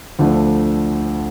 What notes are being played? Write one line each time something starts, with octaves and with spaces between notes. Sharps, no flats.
D2 D3 F3 A3